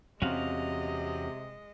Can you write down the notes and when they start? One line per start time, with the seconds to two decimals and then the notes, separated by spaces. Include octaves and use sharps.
0.22 E2 C3 G#3 C4 C#4 F#4 D#5 F5